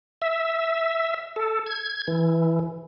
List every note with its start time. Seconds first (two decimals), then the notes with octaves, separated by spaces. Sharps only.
0.22 E5
1.36 A4
1.66 G#6
2.08 E3